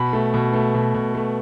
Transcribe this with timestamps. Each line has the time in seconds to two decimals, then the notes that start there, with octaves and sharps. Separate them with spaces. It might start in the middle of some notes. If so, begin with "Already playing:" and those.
Already playing: B2 B5
0.13 A3
0.34 B2
0.54 A3
0.74 B2
0.94 B2
1.15 A3